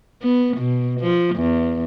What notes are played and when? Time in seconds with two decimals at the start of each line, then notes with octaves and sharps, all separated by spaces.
0.23 B3
0.57 B2
1.00 F3
1.36 E2